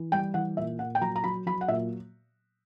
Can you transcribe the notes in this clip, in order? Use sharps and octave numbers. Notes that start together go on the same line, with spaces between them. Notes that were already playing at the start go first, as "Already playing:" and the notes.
Already playing: E3
G3 G5
E3 F#5
A#2 E5
A#2 F#5
G5
F#3 A#5
A#5
F#3 B5
F#3 B5
F#5
A#2 E5